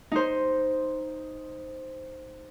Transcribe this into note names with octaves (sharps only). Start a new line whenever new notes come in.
D#4 C5